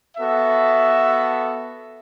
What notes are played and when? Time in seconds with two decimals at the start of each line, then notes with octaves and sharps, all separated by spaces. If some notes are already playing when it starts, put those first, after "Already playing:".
0.16 B3 F#4 A4 E5